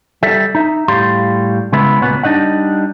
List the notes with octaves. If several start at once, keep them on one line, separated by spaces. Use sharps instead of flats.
G3 A4 E5
D#4 E5
A2 G3 G4 F5 C6
C#3 G#3 B3 E4
C#2 A#2 B3 C#4 F#4 F#5
G3 D4 D#4 D#5 F#5